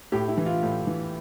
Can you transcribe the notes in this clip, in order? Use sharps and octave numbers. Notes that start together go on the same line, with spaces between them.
A2 G4
E4
E3
F4
A2
E3